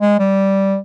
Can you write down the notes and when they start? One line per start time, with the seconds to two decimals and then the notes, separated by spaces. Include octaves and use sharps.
0.01 G#3
0.19 G3